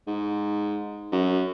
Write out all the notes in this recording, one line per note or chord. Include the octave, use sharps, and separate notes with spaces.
G#2
F#2